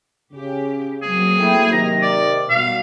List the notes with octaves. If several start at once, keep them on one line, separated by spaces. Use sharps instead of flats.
C#3 G4
F#3 A#3 C4 G#4
A3 E4 G5
C3 D#3 A#5
D5
B2 G3 F#4 F5